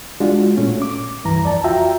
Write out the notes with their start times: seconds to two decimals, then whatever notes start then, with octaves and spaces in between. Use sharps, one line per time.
0.20 G#3 D4 F4 F#4
0.57 A#2 A3 C#4
0.82 D6
1.24 C2 G2 E3 A#5
1.43 F2 D5 A5
1.64 F4 F#4 E5 G5 A#5